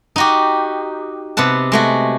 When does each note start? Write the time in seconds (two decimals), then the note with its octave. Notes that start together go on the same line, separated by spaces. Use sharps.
0.16 D#4 F#4 G4
1.37 C3 B3 F#5 A5
1.72 G#3 A3 F#4